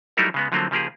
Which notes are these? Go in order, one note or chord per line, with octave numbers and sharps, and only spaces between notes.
F#3 G3 A3 D#4 E4 A#4
C#3 G#3 B3
D3 F3 F#3 A3 A#3 C4
C#3 F3 A#3 G4 G#4